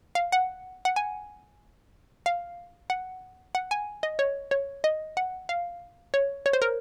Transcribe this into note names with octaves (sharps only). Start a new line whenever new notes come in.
F5
F#5
F#5
G#5
F5
F#5
F#5
G#5
D#5
C#5
C#5
D#5
F#5
F5
C#5
C#5
C5
A#4